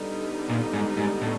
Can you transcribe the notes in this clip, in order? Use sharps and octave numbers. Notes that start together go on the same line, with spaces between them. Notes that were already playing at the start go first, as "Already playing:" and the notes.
Already playing: D3 G3 B3 D#4
A#2
G#2
G#2
A2